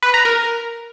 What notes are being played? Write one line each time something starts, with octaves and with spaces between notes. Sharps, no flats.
B4
A#5
A#4